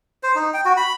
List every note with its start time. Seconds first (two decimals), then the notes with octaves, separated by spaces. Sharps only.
0.23 C5
0.35 D#4
0.54 G5
0.65 F#4
0.77 B5